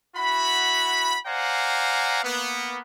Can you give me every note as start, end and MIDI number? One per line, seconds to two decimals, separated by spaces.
0.16 1.16 64
0.16 1.16 66
0.16 1.16 78
0.16 1.16 83
1.26 2.21 72
1.26 2.21 74
1.26 2.21 77
1.26 2.21 78
1.26 2.21 80
1.26 2.21 82
2.23 2.80 58
2.23 2.80 59